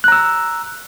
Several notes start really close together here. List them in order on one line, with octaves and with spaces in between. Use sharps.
F#6 A#5 E6